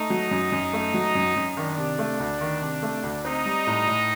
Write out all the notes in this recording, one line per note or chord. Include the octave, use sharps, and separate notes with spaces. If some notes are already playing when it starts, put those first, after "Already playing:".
Already playing: A3 D#4
F#3
F#2
F#2
A3
F#3
F#2
F#2
D#3 D4
C3
A3
D2
D#3
C3
A3
D2
C4 D#4
G3
A2
A2